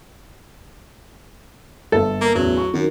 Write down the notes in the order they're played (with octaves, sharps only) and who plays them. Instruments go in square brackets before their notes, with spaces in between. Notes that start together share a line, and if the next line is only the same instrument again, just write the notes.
[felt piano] G1 [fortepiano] A4
[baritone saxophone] A#3
[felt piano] A1 E2 [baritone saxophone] F#3
[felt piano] C#6
[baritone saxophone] F#2 [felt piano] D#3